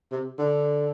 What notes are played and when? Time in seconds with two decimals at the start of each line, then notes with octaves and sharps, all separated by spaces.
0.11 C3
0.38 D3